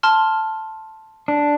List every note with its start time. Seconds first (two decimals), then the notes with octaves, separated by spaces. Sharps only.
0.03 A5 C6 F6
1.28 D4